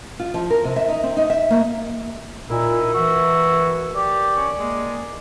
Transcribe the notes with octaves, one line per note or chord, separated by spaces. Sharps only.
F4
F3
A#4
C3
E5
D#4
C4
D#4
E5
A#3
A#2 D#4 E4 A#4
E3 F#4 E5
G4 D5
C#4
G#3 A#3